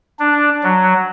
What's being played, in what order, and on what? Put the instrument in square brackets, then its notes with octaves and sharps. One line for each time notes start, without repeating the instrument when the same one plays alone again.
[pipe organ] D4
F#3